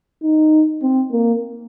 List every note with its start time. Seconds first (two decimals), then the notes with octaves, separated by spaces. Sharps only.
0.23 D#4
0.82 C4
1.12 A#3